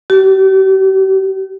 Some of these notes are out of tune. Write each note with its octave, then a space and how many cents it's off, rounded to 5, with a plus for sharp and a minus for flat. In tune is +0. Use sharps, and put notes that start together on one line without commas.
G4 -40